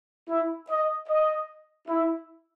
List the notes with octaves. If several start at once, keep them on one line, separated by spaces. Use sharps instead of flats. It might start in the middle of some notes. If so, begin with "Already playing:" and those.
E4
D#5
D#5
E4